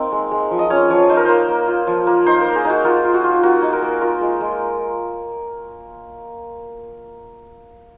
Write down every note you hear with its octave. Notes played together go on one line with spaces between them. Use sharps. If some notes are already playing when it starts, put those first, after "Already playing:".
Already playing: A#3 C4 D#4 A#4
G#3
G#3
F3
D#5
C#4 C#5
F3 C#5
D#4 C5
A#4
A#3 C5
A#3
F4
F3
A#3
D#4 C5
A#3 A#4
G#4
D#4 F#4
A#3 F4
F4
F#4
F4
A#3 F#4
D#4
A#4
A#3
F4 A#4
G#3
G#3